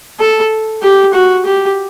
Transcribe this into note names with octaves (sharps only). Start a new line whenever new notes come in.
A4
G4
F#4
G4